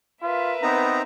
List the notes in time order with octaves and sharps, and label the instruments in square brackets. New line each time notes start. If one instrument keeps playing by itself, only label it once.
[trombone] F4 [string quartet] A#4 B4 E5
[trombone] B3 [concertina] C4 D#4 A#5